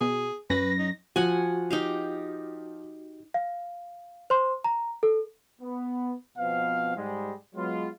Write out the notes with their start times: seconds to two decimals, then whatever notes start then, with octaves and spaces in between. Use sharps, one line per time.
0.01 B2 G#4
0.50 F#2 C#4 B4 A#6
0.79 D#4
1.16 F3 F#4 F#5 G#5
1.71 D#4 G4 F5
3.34 F5
4.30 C5 C6
4.64 A#5
5.03 A4
5.61 B3
6.38 B2 F3 B3 C4 F5
6.97 G#2 G3 G#3
7.55 F#3 G#3 B3 F4